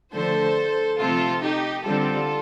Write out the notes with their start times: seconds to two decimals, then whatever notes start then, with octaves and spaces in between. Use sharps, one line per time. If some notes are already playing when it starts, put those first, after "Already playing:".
0.13 D3 F3 A3 A4 C5
0.99 C3 F3 A3 C4 F4 A4
1.42 D#4 G4
1.85 D3 G3 C4 F4 A4